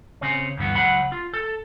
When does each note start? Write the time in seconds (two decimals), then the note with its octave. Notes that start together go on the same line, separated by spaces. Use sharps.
0.21 C#3 C4 C#4
0.57 D2 G2 E3 B3
0.75 C#2 F#3 F#5 B5
1.12 F4
1.34 A4